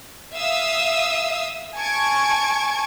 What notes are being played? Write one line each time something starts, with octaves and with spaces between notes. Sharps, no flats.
E5 F5 D#6 E6
G#5 A5 C#6 G#6 D7